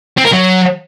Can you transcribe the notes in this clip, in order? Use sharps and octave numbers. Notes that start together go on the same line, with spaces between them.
C4
A#4
F#3